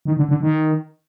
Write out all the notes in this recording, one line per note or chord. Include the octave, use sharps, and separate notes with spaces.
D#3
D3
D3
D#3